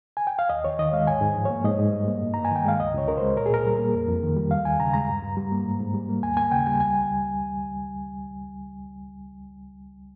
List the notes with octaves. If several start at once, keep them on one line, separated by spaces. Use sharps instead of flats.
G#5
G5
F5
D#2 D#5
D#2 C#5
D#3 D#5
G#3 F5
G#2 G#5
G#2
F3
A#3 C#5
G#2 D#5
G#2
G3
A#3
G2
G2 A#5
G#5
D#3 G5
G#3 F5
C#2 D#5
C#2 C#5
C#3 A#4
G#3 C5
A#2 A#4
G#4
A#2 A#4
G3
A#3
F2
F2
D#3
G3
D#2 F5
D#2 G#5
C#3 A#5
G#3 A#5
G2
G2
G3
A#3
G#2
G#2
G3
A#3
D#2 G#5
A#3 G#5
C#3 G5
G3 G#5
C#2 G#5